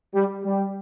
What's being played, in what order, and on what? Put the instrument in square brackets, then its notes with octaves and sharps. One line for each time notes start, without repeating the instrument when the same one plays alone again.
[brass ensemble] G3
G3